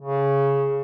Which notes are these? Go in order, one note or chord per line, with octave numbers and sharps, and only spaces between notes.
C#3